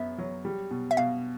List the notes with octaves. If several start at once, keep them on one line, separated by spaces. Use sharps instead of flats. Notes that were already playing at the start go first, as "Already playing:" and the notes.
Already playing: F#2 B3 E5
F#3
G3
B2
E5
B2 F5